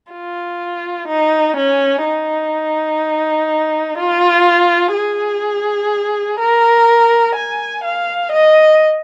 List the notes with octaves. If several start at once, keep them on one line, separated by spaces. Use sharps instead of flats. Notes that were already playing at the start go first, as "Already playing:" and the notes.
F4
D#4
C#4
D#4
F4
G#4
A#4
G#5
F5
D#5